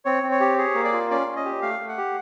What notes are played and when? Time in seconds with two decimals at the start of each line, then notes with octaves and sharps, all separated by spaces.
0.05 C4 C#5
0.23 C4
0.31 C#5
0.40 G4
0.58 G#4 C#5
0.75 A#3
0.84 D5
0.93 F4
1.11 C#4 D5
1.27 C#4
1.36 D#5
1.45 G4
1.62 A3 F5
1.80 A3
1.88 F#5
1.98 G4